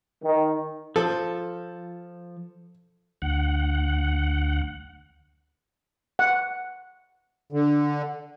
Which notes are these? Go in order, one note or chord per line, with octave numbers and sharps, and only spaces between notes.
D#3
F3 A4
D2 F#5
F#5
D3